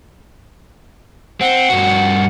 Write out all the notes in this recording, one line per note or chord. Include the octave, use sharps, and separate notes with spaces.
C4 F#5
G2 F#4